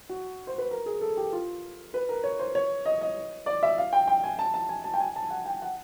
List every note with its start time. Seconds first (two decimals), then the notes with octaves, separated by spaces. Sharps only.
0.09 F#4
0.47 C5
0.58 B4
0.71 A#4
0.86 G#4
1.01 A4
1.17 G4
1.33 F4
1.94 B4
2.09 A#4
2.24 C#5
2.39 C5
2.55 C#5
2.86 D#5
3.01 D#5
3.46 D5
3.63 E5
3.78 F5
3.93 G5
4.08 G5
4.24 G#5
4.39 A5
4.54 A5
4.69 G#5
4.84 A5
4.94 G5
5.00 G#5
5.16 A5
5.30 F#5
5.46 G5
5.62 F#5